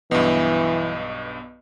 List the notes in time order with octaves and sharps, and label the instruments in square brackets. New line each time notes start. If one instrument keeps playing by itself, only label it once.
[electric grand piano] B1 G2 [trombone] E3 [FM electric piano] B3 D#5